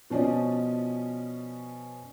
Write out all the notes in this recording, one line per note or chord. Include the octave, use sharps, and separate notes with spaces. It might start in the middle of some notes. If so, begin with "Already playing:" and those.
B2 F3 C#4 D5 D#5